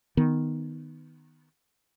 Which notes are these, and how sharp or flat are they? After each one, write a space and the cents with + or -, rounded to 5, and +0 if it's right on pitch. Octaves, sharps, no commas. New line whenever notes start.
D#3 +0 B3 +5